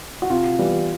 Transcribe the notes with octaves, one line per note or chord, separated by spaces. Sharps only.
F#4
C3 F4
E3 G3 B3